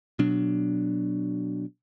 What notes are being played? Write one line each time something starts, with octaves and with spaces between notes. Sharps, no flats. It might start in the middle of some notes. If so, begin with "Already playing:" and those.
B2 F#3 D4